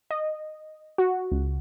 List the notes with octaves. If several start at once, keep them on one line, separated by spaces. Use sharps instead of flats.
D#5
F#4
C#2